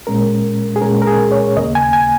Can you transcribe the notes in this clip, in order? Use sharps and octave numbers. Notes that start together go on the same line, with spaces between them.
A#2 G#3 C#4 A#4
G#4
A#2 G#3 C#4 A#4
A#4
G#4
C#5
D#2 C#3 A#3 D#5
G#5
G#5